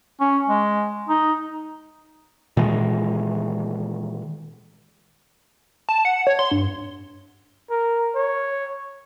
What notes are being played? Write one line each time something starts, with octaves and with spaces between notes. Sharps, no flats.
C#4
G#3
D#4
A#2 D#3 E3 G#3
A5
F#5
C#5
C6
G2
A#4
C#5